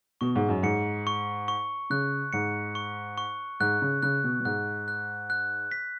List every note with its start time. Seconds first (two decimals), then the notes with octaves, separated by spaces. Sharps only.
0.21 B2 C#6
0.36 G#2
0.49 F#2
0.63 G#2 C#7
1.07 C#6
1.48 C#6
1.90 C#3 F#6
2.33 G#2 C#7
2.75 C#6
3.18 C#6
3.60 G#2 F#6
3.82 C#3
4.03 C#3 F#6
4.24 B2
4.40 B2
4.45 G#2 F#6
4.88 F#6
5.30 F#6
5.72 B6